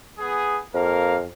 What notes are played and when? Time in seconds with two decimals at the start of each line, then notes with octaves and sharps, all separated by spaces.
0.19 B3 G#4
0.74 F2 A#3 A#4 F5